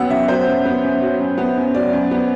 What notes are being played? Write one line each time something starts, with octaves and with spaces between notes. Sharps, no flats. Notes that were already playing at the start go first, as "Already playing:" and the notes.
Already playing: F#2 F#3 B3 F#5 G5 E6
F#2 E5
F#3 C5
F#2
B3
F#2
F#3
F#2
B3
F#2
F#3 D5
F#2
B3